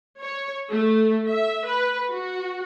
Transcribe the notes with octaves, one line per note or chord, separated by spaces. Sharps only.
C#5
A3
E5
B4
F#4